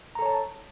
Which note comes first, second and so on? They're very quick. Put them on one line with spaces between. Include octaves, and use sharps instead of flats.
A#5 A4 C#5 A5